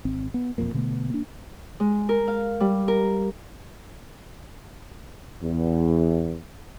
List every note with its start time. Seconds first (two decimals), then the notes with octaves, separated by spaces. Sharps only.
0.05 G#1 C4
0.34 B3
0.58 E1 F2 A#2 A#3
0.74 B2 D3 A3 B3
1.10 A#3 D4
1.80 G#3
2.09 A#4
2.28 F5
2.60 G3
2.88 A#4
5.42 E2